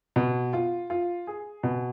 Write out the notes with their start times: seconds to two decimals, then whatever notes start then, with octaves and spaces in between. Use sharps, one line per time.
0.16 B2
0.53 F4
0.90 F4
1.27 G#4
1.63 B2